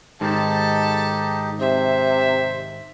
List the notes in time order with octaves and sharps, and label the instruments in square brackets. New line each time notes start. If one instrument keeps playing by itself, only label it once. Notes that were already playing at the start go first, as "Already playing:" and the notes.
[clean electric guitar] G#2 D#3 [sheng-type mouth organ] D#4 G4 [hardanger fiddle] A4 A5
[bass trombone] C3 [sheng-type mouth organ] C5 [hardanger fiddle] E5